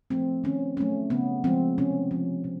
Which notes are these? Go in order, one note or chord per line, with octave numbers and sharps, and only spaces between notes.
F3 A3 C4
D#3 C#4
F#3 A3 C#4
C#3 B3
F3 G#3 C4
C3 C#4
F3 G#3
C3